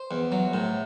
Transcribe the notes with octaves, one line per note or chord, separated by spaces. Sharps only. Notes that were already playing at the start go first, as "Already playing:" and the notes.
Already playing: C5
E2
F#3
A2